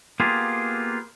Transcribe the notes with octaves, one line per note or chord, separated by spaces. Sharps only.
A#3 B3 F4 G4 G#4